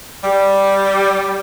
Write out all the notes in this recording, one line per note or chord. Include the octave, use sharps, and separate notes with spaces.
G3